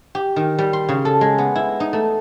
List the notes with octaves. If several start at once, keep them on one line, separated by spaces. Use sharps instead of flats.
G4
D#3
G3
C6
C#3
A4
G#3
B3
E4
D#4
A3